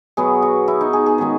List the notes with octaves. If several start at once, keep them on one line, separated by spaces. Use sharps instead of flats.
B2 F#3 B3 G#4
F#4
E4
D#4
G#4
G#4
D#3 G#3 C#4